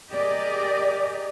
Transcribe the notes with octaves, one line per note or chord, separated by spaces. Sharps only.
G4 G#4 A#4 D5 D#5